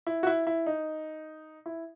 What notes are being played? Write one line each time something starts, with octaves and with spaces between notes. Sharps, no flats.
E4
F#4
E4
E4
D#4
E4